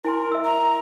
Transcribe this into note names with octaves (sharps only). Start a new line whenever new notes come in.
E4 A#4 G#5 C6
E5 E6
A#5